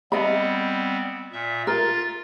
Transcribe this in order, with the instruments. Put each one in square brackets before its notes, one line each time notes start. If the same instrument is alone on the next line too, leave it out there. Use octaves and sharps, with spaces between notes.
[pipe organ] G3 B3 C4 [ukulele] D#5 B5
[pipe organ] A#2 E5
[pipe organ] F4 A6 [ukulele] A#4